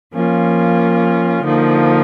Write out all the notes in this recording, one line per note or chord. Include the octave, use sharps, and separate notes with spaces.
F3 A#3 C#4 F4
D3 F3 A#3 D#4